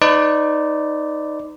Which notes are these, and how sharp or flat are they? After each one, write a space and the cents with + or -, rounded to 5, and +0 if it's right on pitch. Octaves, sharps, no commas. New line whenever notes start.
D#4 +0 B4 +40 D5 +0